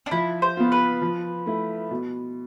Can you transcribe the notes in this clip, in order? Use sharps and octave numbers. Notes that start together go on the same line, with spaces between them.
D4
F3 E4
C5
B3 F4
B4
F3
A3 E4
B2